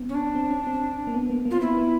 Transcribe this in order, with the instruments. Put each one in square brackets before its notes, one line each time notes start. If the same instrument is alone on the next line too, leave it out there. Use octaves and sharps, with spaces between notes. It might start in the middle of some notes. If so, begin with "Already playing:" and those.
Already playing: [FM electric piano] B3 C4
[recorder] C#4
D4
[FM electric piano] C4
C#4
C4
A#3
B3
A#3
A#3
[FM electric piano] C4 [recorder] F4
[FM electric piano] B3 [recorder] E4
[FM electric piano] B3